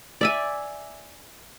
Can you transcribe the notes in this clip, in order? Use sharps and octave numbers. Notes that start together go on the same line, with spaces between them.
D5 E5 G#5